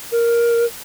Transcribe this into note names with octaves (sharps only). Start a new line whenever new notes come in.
A#4